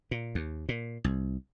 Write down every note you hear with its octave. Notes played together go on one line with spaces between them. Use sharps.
A#2
D#2
A#2
C2